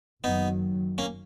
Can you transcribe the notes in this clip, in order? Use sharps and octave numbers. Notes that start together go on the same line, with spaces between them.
F#1 F#2 D#3 F#3 B3 D#4
A#3 C#4